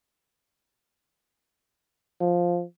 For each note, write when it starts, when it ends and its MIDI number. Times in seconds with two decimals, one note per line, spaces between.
2.21 2.64 53